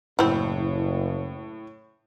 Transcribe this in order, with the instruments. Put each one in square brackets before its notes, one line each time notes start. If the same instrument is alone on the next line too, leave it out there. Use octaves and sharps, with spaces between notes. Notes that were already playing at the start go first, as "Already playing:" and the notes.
[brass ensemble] F#1 [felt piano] A2 [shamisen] C4 E4